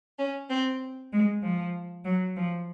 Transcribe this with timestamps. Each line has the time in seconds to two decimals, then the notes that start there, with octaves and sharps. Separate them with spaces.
0.18 C#4
0.49 C4
1.11 G#3
1.42 F3
2.04 F#3
2.35 F3